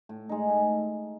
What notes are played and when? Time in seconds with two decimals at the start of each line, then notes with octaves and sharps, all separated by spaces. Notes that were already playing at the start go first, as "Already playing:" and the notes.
0.09 A2
0.29 G#3 D#4
0.49 A2